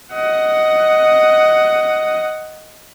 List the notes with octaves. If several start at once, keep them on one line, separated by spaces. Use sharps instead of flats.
D#5 F#5